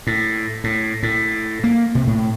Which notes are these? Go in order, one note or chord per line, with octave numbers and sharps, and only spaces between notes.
A2
A2
A2
A#3
C3
A2